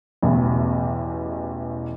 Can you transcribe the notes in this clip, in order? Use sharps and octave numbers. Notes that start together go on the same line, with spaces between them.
A1 E2 B2